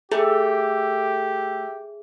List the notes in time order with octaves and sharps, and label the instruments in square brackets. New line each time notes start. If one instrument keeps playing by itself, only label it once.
[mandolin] A3 [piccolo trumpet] G4 [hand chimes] G#4